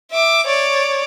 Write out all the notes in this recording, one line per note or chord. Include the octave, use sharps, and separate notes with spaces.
E5 D6
C#5 D5